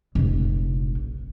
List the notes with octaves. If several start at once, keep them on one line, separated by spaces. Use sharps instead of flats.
F1 A#1